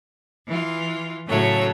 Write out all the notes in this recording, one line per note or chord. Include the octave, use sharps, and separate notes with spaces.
E3 F4
A2 C#3 F#3 A3 C#5